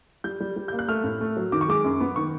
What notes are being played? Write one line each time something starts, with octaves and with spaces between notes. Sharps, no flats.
G3 G6
G3
G3
A#3 G6
F#6
A3 F6
A2
A3
F#3
D#3 D6
C#6
G#3 D6
F#2
B3
D#3 C#6